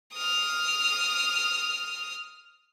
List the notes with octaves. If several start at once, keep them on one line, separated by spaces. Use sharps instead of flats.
D#6 F6